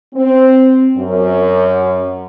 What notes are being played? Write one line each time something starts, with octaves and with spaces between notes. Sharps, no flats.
C4
F#2